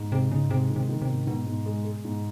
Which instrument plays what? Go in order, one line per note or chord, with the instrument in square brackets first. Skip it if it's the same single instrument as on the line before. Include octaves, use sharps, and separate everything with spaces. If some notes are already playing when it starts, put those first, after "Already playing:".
Already playing: [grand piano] G#2
[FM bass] C3 [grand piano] G#3
[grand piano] G#2 [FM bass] C#3
[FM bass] C3 [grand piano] G#3
[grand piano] D#3
[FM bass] C3
[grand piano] D#3
[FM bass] C3
[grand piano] G#2
[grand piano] G#2 [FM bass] B2
[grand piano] G#2
G#3
G#3
G#2